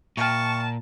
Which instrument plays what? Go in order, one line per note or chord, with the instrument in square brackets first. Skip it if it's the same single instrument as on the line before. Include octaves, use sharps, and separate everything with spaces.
[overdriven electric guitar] A#2 [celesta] E5 G5 F6 [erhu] A5 [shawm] C#6